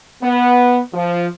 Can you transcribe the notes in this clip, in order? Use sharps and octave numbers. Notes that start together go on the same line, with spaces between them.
B3
F3